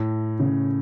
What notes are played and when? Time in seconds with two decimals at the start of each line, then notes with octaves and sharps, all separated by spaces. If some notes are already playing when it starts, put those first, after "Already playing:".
Already playing: A2
0.40 C#3